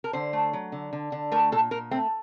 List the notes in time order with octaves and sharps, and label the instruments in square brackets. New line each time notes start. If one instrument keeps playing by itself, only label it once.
[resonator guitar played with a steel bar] A#4
D3 C5
A3
F#3
D3
D3
D3
A3 A#4
A#2 A4
A#2 A#4
A3 C4